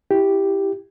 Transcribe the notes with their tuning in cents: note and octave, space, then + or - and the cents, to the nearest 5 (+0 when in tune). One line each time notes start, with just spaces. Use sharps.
E4 +0 G4 +0